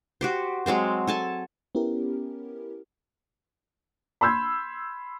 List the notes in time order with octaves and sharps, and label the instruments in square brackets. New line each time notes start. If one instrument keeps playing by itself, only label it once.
[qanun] F#4 G4 C5
F#3 G#3 C4 C5
A4 G#5 A5
[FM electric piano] B3 C#4 E4 G4 A#4
[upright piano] B5 C6 E6 G6 G#6